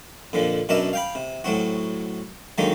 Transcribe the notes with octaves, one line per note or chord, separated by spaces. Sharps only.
F2 A#2 D3 F3
F#2 B2 D4 A#4 D#5 E5
F5 G5 B5
C3
A2 F#3 C4 F#4
D3 D#3 F#3 G#3 A#3 D#4